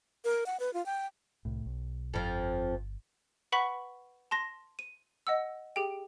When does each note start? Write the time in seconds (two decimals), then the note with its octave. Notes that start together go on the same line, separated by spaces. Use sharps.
0.25 A#4
0.46 F#5
0.60 B4
0.74 F4
0.86 G5
1.45 C2 A2
1.66 B1
2.14 G1 F2 F3
3.52 B4 F#5 B5 C#6 B6
4.31 A5 C6 A#6
4.79 D#7
5.27 D#5 F#5 E6
5.76 G4 G#4 G5